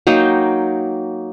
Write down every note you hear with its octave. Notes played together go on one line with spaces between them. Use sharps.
F#3 A#3 D#4 G5